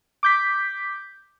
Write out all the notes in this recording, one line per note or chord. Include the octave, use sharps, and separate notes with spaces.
D6 G6 B6